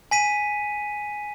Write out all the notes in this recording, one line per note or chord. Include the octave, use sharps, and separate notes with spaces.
G#5 B6 D#7